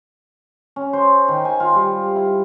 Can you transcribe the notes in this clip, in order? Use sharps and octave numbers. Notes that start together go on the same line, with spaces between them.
C#4
C5
D#3
G#5
F4
G3
E4